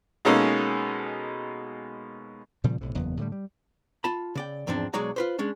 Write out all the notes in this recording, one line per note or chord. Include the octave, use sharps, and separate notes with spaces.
B2 G#3 A#3 C#4 D#4 A4
A#2 C#3 F3 G3
B1 A2 C3
F#1 E2 B3
A2 D3 E3 G3
G3
F4 A5 B5
C#3 D5 G5
E2 G#2 F3 C4 D4
B1 F#3 G#3 C#5 D5 A#5
F4 B4 C5
G#3 C#4 D4